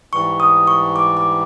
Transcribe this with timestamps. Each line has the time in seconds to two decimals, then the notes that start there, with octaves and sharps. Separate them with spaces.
0.13 G#2 E3 G3 C#6
0.40 D#6
0.67 C#6
0.96 D6
1.17 D6